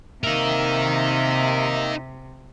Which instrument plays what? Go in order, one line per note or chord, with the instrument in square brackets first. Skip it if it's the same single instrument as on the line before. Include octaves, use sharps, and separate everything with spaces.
[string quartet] C3 [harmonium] A#3 E5 [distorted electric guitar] D#4 A#4